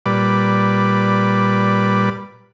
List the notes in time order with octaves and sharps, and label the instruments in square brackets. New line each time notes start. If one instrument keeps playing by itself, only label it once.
[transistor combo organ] A#2 G3 B4 D5